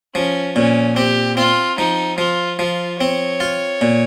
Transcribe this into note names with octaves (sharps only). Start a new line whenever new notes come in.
F3 C#4
A#2 C#4
C4 G4
C4 F4
F3 D#4
F3 F4
F3 F4
C4 C#5
F4
A#2